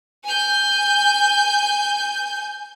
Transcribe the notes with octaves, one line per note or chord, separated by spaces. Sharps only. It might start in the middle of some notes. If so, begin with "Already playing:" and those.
G#5 G6